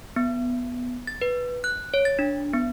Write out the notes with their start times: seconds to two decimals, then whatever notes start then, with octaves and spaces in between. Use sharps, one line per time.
0.16 B3
1.07 A6
1.21 B4
1.64 F#6
1.94 C#5
2.05 A6
2.19 D4
2.53 B3